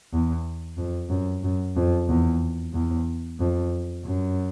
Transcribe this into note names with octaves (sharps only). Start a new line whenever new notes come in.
E2
F2
F#2
F#2
F2
E2
E2
F2
F#2